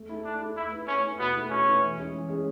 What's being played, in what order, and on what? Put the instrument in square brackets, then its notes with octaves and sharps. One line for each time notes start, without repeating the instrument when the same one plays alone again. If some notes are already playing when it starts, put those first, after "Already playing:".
Already playing: [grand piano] A3
E4 A4
[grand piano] A3 [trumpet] D4
[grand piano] E4 A4
[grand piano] A3 [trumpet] E4
[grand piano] E4 B4
[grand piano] A3 [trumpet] C#4
[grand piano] E4 B4
[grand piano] B2 [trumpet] B3
[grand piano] A3 E4 B4
[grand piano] B2 [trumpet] C#4
[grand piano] A3 E4 B4
E3
G#3 C#4 G#4
E3
G#3 C#4 G#4